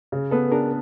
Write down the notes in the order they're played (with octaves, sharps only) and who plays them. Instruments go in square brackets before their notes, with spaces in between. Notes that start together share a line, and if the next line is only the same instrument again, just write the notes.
[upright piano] C#3
[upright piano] B3 [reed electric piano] A4 B4
[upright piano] D4 [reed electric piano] G#4 A#4